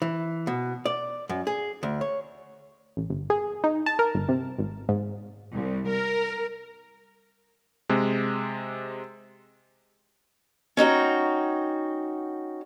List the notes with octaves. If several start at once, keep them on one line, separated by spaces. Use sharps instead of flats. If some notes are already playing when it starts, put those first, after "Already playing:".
E3
B2
D5
F#2
G#4
D2
C#5
A1
G1
G#4
D#4
A5
A#4
G1
C3
G#1
G#2
C2
A#4
C3 G#3
C#4 D#4 F#4 G5